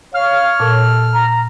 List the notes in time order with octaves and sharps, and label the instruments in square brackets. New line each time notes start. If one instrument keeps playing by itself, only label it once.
[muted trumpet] C#5 [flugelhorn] F5 [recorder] F6
[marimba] A#2 [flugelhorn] A4
[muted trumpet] A#5